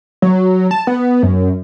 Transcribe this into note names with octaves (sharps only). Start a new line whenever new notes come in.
F#3
A5
B3
F#2